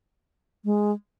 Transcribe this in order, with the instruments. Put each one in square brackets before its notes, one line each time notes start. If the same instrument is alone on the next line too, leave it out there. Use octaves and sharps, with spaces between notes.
[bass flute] G#3